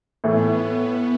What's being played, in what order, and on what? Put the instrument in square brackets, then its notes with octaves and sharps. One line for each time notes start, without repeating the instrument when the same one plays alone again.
[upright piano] A2 E3 A3 [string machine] B3